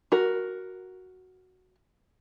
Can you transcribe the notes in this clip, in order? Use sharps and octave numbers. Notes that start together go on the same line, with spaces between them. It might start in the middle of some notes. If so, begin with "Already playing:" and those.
F#4 A#4